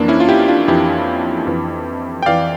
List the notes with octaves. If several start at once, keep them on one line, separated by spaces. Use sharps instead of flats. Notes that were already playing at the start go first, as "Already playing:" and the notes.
Already playing: F2 E3 A#3 D4
C#4 E4
F4
E4 G4
D4 F4
F2 E3 E4 G4
F2 E3
G5
F2 E3 D5 F5